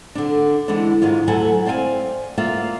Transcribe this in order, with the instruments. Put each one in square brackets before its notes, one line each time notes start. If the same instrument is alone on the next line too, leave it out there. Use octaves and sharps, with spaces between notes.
[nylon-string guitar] D3 D4
D3 E3 G#3 B3 D4
G#2 D#3 G#3 F4
D2 F#3 E4 A4 F#5 G#5
C4 D5 F5 G5 G#5
A#3 F4 D5 E5